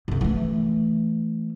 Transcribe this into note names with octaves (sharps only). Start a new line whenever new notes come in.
F#2 C#3
E3 A3